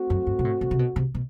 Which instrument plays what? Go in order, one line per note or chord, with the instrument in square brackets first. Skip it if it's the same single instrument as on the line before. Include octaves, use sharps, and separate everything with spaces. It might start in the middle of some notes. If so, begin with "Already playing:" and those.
Already playing: [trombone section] A3 C4 F#4
[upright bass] F#2
G2
B2
A2
B2
C3
B2
C3
B2